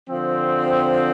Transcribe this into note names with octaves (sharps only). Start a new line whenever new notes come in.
D3 F3 C4